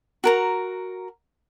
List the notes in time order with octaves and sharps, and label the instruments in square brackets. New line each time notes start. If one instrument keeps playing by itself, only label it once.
[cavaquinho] F#4 A#4 A#5